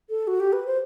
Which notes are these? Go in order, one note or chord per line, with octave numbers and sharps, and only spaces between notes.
A4
F#4
G4
B4
C5